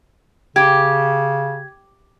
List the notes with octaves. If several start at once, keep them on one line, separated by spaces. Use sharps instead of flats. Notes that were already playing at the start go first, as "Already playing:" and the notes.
C#3 G4 G#6